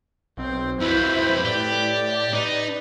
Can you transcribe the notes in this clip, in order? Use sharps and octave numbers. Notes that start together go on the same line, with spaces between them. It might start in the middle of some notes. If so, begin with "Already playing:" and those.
B1 C4 C5
F2 F#3 E4 B4 C5 B5
A2 G4 D5
D#4 B4